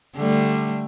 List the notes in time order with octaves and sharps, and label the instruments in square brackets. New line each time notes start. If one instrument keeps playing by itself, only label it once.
[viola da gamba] D3 G3 A3